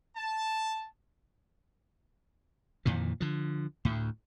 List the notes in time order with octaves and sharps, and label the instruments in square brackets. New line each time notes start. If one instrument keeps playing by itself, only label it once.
[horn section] A5
[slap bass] F2 A#2 D#3 E3
D3 F3
D2 A2